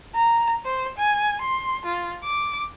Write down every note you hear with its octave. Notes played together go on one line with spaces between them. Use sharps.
A#5
C5
G#5
C6
F4
D6